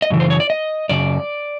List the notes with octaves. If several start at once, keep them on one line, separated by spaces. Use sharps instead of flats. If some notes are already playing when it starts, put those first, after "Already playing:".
D#5
F#2 C#3 E3
C5
C#5
D5
D#5
F#2 C#3 D5